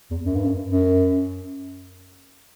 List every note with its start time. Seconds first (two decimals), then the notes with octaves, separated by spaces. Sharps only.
0.10 E2
0.25 F#2
0.36 G2
0.46 F#2
0.70 F#2